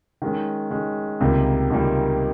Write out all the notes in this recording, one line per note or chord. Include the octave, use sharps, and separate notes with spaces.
D#3 G#3 C#4
D#3 G#3 C#4
C#2 C3 D#3 G3 A#3
C#2 C3 D#3 G3 A#3